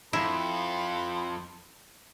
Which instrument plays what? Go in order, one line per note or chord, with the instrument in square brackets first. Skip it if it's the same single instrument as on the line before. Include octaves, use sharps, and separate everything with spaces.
[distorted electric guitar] F2 [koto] E4 [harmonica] A4 C5 B5